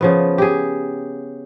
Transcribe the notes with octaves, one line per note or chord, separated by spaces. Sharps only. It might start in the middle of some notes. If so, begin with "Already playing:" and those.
C#3 F3 B3
G4 G#4